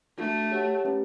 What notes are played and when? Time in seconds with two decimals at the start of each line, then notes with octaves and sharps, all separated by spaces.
0.18 A3 D4 F#4 A4
0.52 G4 C#5 F#5 A5
0.85 A3 C#4 G4 B4